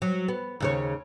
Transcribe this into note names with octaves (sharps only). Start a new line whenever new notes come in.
F#3
B3
D#2 C#3 C#5